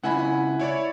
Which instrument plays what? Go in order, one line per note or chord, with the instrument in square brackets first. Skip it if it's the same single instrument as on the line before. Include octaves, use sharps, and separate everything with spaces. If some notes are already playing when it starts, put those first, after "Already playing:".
[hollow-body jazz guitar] C#2 E4 E5 [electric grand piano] F#5 G#5 B5
[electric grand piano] E4 C#5 D5